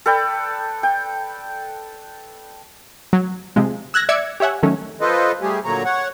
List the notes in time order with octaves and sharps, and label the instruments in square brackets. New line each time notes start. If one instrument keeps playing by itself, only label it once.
[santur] A4 B4 D5 G5
G5
[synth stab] F#3
C3 F3 G#3
E6 F#6 G#6 A#6
D5 E5 D6 E6 G#6 C#7
G4 C#5 E5 F#5 G#5
D#3 F#3 A3 C#4
[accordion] F4 A4 B4 C5 D#5
G3 A3 G4 G#4
A#2 D3 F#3 A#3 C#5 A#5
C#5 F#5